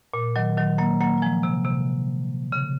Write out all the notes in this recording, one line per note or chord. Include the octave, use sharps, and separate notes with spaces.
A#2
D#3 F#3
D#3 F#3
F#3 A#3
F#3 A#3
F#3
F3 G#3
C3
C3
C#3